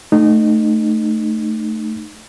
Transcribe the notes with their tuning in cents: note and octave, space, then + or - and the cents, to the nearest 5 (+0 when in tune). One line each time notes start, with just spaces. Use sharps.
A3 +0 D#4 -25